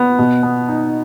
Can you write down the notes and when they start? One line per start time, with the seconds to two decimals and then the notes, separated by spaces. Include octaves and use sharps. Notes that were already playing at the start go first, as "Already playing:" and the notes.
Already playing: B3
0.19 B2
0.43 B3
0.68 D#4